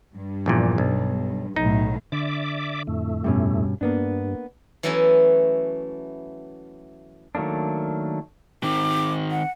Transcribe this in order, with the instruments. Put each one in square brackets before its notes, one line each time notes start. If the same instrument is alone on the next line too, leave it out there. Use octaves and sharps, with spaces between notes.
[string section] G2
[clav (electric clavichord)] A#1 E2 A#2
B1
[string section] B1 A2 [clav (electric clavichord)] D#4
[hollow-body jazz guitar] D3 [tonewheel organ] D5 E5 D6
[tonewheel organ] F2 A2 A3
[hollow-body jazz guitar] G2 B2 C#4
[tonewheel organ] G2 [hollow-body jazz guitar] A#3 B3 D4
[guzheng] E3 F#3 A3 B3 C#4 E4
[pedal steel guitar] D#3 F#3 A3 A#3 D4
[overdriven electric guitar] D#3 C4 [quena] D6
[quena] F#5